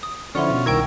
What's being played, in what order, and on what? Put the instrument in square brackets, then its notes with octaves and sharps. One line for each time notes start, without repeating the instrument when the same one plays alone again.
[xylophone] D#6
[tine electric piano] D3 F3 E4 [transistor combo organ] C#4 F4 [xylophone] D5 F#5 C6
[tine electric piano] B2
[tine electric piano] C2 D#3 [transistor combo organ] E4 A#4 [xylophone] G5 C#6 G#6